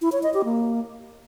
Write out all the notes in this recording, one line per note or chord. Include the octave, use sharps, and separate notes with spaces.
E4
C#5
D#5
G4
A#3